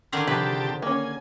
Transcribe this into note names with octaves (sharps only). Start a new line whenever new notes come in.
D3 D#3 G#4
C3 F3 G4 B4 A5
A#3 C#4 G#5